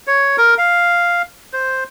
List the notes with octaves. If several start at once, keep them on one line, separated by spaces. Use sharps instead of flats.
C#5
A#4
F5
C5